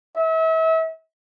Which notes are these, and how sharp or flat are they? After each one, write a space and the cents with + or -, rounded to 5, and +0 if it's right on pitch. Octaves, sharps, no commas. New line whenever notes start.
E5 -35